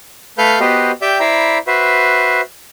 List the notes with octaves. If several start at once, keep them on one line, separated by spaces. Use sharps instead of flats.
A3 A4 B4 F5 F6 G6
B3 F#4 G4 B4 C5 D#5
G4 D5 E5 G5 G6
E4 C5 D5 E5 A#5 B5
F#4 B4 C5 E5